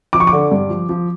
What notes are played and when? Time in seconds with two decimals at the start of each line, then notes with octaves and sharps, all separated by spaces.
0.13 F3 D6
0.20 C#6
0.27 D6
0.33 D3
0.51 G2
0.69 F3
0.89 F3